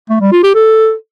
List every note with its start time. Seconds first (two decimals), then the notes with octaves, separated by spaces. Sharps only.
0.09 A3
0.21 G3
0.32 F4
0.43 G4
0.54 A4